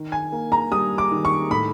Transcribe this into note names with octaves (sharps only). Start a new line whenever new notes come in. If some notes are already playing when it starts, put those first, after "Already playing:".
Already playing: D#3
G#5
A#3
A#5
G3 D#6
D6
D#3
C#6
A2 B5